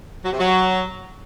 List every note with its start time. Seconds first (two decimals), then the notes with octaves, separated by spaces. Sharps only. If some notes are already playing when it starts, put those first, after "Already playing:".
0.25 F#3
0.32 C3
0.39 F#3